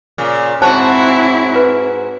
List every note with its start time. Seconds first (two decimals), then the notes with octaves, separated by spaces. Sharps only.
0.18 A#2 C#3
0.62 G#2 C4 E4 F#4 C5 C#5 G#5 A5
1.56 B4